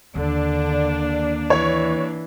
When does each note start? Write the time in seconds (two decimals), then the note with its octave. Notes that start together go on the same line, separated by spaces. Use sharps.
0.16 D#2 D3 A#3 D4
1.50 E3 C#5